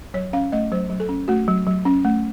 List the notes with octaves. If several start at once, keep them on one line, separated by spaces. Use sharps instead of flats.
F#3 C#5
C#4 F5
A3 D#5
F#3 C5
F#3
A4
C#4
A3 F#4
F#3
F#3
C#4
A3